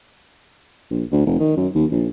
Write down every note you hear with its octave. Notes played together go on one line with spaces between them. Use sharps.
A#1
D2
F1
D#3
F#2
D#2
A#1